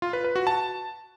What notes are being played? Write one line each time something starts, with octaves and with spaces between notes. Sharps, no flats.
F4
B4
B4
F#4
A5